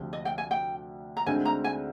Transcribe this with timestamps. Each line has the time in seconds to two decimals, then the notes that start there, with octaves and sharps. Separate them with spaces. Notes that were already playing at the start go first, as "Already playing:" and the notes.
Already playing: D2 C3 F3
0.13 D#5
0.25 G5
0.38 G#5
0.51 G5
1.17 A#5
1.26 D2 D3 G#3 C4 D#4 G#5
1.45 A#5
1.64 G#5